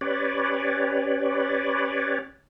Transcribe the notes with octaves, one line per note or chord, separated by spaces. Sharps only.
C#4 G4 B4 C#5 D5